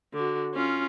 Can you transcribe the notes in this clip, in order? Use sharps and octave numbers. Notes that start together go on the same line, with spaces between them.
D3 F#4
C#4 F4